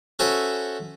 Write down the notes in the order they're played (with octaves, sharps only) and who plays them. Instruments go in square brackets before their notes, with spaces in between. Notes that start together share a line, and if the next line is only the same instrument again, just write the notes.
[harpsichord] C#4 F#4 A4 C5 E5 B5